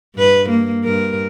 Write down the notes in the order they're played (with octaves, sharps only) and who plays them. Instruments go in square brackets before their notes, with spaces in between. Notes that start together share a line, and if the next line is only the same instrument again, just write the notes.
[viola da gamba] G2 B4
A#3
G2 A#4